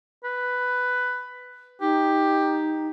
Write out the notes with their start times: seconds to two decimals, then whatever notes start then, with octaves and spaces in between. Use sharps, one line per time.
0.24 B4
1.81 D#4 G4